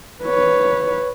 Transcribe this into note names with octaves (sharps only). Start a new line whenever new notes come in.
B4 C#5